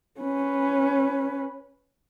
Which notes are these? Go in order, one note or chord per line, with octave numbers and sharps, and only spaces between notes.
C#4 B4